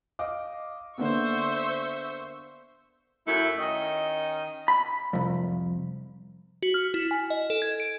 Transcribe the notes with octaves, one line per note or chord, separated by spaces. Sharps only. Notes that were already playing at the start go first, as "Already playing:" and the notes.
D#5 F5 D6
D3 A#3 B3 C5 E5 C#6
F#2 A3 E4
D#3 C#4 D#5
B5
C2 F2
F#4
F6
E4
G#5
D#5
A4
G#6
D7